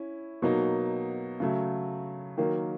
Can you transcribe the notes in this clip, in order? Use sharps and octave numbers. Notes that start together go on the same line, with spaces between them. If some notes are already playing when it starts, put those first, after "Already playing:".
Already playing: C#4 E4
B2 F#3 A#3 D#4
C#3 F#3 A3
D#3 F#3 A#3